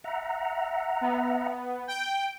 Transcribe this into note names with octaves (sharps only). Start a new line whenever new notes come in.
E5 F#5 A#5
B3
G5